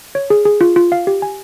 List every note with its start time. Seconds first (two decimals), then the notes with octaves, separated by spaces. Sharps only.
0.15 C#5
0.30 G#4
0.45 G#4
0.61 F4
0.76 F4
0.92 F5
1.07 G4
1.22 G#5